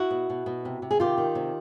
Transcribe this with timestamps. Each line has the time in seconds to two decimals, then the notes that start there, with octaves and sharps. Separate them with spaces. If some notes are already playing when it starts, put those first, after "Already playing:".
Already playing: E4 F#4
0.11 B2
0.30 B2
0.46 B2
0.65 C3
0.82 C3
0.91 G#4
1.00 D#3 F4 G4
1.17 D#3
1.35 C3